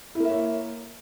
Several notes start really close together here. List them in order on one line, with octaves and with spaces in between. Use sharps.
E4 A#3 E5 C#5